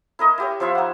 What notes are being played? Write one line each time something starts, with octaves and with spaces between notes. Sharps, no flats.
E4 A#4 D#5
E4 G4 C#5
F3 E4 F4 E5
D#4 F#5